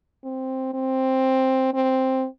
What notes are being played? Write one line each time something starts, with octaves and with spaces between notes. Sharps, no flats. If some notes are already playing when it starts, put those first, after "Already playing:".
C4
C4
C4